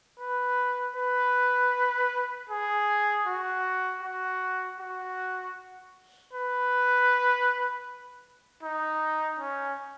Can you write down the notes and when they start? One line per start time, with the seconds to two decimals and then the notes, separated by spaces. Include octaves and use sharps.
0.20 B4
0.96 B4
2.49 G#4
3.26 F#4
4.03 F#4
4.80 F#4
6.33 B4
8.63 D#4
9.39 C#4